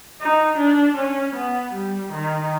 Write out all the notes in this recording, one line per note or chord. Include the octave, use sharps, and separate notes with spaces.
D#4
D4
C#4
B3
G3
D#3